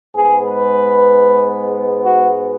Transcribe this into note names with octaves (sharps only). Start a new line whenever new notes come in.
G#2 G#3 B3 G#4
B4
F#4